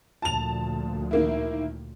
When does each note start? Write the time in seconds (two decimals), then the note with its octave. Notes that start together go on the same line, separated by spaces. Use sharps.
0.22 D2 A#2 F3 A5 F7
1.11 D#3 A#3 E4